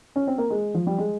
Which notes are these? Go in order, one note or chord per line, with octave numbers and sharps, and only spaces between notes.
C#4
C4
A#3
G#3
F3
G3
G#3